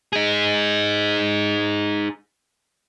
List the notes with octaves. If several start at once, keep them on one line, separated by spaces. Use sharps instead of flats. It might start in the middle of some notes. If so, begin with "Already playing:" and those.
D#4 G#4